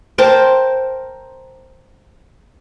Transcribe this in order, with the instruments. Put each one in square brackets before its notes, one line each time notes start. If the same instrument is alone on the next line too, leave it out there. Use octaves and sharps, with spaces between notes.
[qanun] A#4 C5 G5 A5